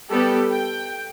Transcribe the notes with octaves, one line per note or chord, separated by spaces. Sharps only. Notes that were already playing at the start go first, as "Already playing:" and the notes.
G3 B3 G4 A4
G5